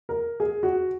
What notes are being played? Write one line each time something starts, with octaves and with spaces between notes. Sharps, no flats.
A#4
G#4
F#4